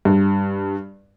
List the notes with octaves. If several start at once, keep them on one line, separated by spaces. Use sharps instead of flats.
G2